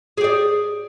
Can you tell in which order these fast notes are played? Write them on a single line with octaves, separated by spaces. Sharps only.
G#4 G4 D5